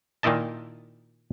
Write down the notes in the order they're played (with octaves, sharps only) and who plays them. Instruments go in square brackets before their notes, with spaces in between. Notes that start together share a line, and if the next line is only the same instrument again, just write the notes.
[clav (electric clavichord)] A#2 D#3 A#3 E4 D#5 A5